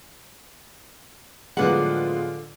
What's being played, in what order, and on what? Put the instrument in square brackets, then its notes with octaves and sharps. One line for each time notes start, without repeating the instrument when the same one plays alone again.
[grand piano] A2 F3 F#3 [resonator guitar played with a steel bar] D3 F#5 [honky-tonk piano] G#3 B3 F4